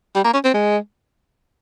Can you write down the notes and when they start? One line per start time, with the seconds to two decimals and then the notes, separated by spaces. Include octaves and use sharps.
0.15 G3
0.24 A#3
0.34 C#4
0.44 C4
0.54 G#3